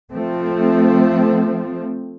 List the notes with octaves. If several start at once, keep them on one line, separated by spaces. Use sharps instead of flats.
F3 A3 C4